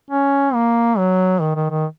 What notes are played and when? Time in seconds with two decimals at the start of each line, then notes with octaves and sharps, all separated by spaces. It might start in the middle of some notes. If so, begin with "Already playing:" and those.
0.11 C#4
0.54 A#3
0.98 F#3
1.41 D#3
1.56 D#3
1.71 D#3